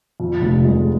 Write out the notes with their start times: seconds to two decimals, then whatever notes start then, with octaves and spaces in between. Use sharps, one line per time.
0.20 F2
0.42 F1
0.65 G#3